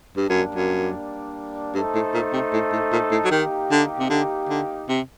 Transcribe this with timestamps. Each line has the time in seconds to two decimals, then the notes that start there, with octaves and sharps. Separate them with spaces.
0.17 G2 G3 A#3 D4
0.30 F#2
0.55 F#2
1.74 G2 A3 D#4 A4 C5
1.95 A2
2.14 A#2
2.33 C3
2.53 A2
2.72 A2
2.92 A#2
3.11 A2
3.25 F#3
3.31 D#3 A#3 D#4 G4
3.71 D3
4.00 C3
4.10 D3
4.49 D3
4.88 C3